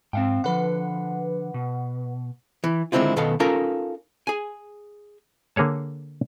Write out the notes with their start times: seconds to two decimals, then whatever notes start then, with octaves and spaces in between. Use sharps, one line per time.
0.13 G#2 C4 F5 G5
0.44 D3 F3 B4 F#5
1.54 B2
2.64 E3
2.92 D3 D#3 G#3 C4 E4 F4
3.16 B2 D#3 B3 A4 F5
3.40 C#4 D#4 F4 A4 A#4 A#5
4.27 G#4 G#5
5.56 D3 A#3 G#4 C#5 A5